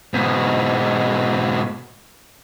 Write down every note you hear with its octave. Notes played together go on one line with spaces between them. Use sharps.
G#2 B2